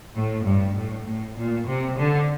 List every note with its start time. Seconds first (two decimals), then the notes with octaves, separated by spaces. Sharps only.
0.15 A2
0.45 G2
0.76 A2
1.07 A2
1.36 A#2
1.67 C3
1.97 D3